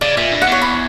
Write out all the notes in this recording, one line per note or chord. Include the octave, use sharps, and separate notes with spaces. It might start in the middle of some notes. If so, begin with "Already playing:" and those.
C#3 D5
A#2 E5
G2
F#5
E2
C#5
B5